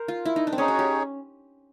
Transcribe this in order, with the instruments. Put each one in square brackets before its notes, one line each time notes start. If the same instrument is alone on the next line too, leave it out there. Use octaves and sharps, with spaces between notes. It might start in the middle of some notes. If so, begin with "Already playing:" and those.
Already playing: [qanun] A#4 C5
F4
E4
D#4
D4
C4
[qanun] C#4 [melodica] D#4 G#4 C#5
[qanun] F#4
G4